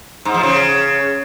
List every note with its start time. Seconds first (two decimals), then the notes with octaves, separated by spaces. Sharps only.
0.25 G#2
0.34 F3
0.43 C#3